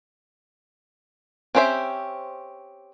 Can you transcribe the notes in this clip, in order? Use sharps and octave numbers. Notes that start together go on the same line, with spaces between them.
C4 C#4 G4 C5 E5